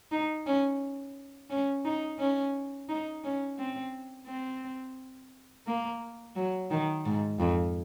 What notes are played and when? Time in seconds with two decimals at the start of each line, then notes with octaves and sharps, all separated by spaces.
0.12 D#4
0.46 C#4
1.50 C#4
1.85 D#4
2.19 C#4
2.89 D#4
3.24 C#4
3.59 C4
4.27 C4
5.67 A#3
6.36 F#3
6.71 D#3
7.06 G#2
7.40 F2